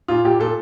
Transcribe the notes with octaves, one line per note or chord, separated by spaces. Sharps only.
A#2 F4
A#2 G4
A#2 A4